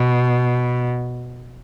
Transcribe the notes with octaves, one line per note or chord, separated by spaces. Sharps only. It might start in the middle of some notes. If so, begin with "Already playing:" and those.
Already playing: B2